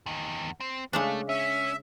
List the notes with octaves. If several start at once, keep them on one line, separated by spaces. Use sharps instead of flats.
E2 D#3
C4
C#3 G#3 A3 D4
C#4 E5